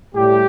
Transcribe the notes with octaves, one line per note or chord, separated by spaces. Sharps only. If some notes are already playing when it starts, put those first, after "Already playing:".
A2 G3 G4